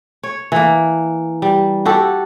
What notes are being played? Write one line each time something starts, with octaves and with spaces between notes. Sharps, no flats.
C#5
E3 A#3
G3
F#4 G4 A4